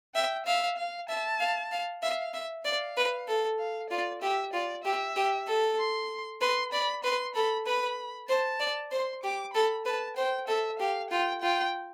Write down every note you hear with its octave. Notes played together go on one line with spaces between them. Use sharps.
E5 G5
E5 F5
F5
E5 A5
F5
F5
E5 F5
E5
D5 F5
B4
A4
F5
F4 D5
G4 E5
F4 D5
G4 E5
G4
A4
C6
B4 C6
D5 B5
B4 C6
A4 B5
B4 B5
C5 A5
D5
C5 C6
G4 D6
A4 B5
B4 A5
C5 G5
A4 E5
G4 F5
F4 G5
F4 G5